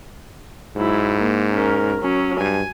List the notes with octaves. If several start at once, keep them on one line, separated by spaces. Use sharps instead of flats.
G#2 F#3 E4
A#3
C#4 A#4
F#3 C#4
G2 G#5